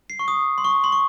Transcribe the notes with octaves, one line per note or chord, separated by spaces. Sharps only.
C7
C#6
D#6
C6
C#6
C6
C#6